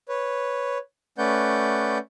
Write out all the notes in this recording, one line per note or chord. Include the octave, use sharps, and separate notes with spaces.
B4 C#5
A3 C#4 B4 D5 F#5 G6